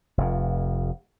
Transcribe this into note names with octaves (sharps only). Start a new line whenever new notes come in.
F1 F2